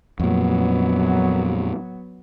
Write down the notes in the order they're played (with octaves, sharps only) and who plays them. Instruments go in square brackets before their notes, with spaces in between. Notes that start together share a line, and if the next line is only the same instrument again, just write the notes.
[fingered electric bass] F2 A#2 [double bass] F#3 B3